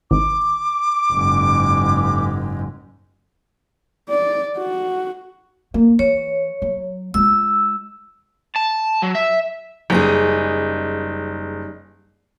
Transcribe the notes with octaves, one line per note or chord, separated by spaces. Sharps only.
G#1 D6
F#1 G#2
D5
F#4
A#3
E3 C#5
F#3
G#3 F4 E6
A5
F#3
E5
F#1 G3 D#4 G#4